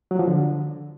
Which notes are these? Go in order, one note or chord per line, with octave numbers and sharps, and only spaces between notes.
F#3
F3
D3